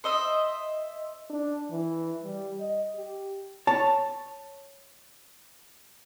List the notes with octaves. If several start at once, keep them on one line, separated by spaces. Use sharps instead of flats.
C5 D#5 E5
D4
E3
G3
D#5
G4
C#5 A5